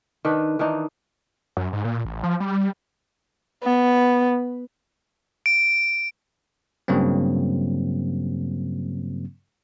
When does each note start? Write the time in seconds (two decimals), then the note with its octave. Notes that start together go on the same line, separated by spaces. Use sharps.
0.25 D#3 D4 B4
0.59 D#3 E3 D4 D#4
1.57 F#2
1.73 G#2
1.85 A#2
2.05 A1
2.23 F3
2.40 G3
3.64 B3
5.46 D7
6.88 G2 C#3 F#3 A#3 C4